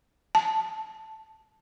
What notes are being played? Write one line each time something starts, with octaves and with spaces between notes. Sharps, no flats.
A5